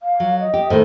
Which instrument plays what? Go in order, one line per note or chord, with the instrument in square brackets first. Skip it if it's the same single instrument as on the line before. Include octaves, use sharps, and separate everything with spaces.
[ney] F5
[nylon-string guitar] F#3
[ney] D#5
[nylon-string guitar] G4
[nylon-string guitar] A2 D#3 [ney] C5